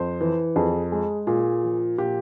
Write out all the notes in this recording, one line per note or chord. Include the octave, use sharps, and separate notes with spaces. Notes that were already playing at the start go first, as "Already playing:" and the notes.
Already playing: F2 C5
E3
F2 G#4
G#3 G#4
A#2 G#4
F3
A#2 G4